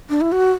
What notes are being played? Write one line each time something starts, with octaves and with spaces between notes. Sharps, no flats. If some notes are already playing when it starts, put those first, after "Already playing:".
D4
E4
F#4